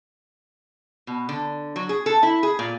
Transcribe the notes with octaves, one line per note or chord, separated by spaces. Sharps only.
B2
D3
F#3
G#4
A4
E4
G#4
A#2